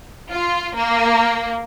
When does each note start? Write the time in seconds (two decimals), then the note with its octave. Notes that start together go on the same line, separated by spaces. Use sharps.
0.31 F4
0.76 A#3